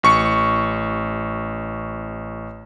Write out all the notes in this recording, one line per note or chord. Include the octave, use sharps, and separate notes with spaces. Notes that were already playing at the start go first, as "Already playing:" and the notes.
A1 C#6 C#7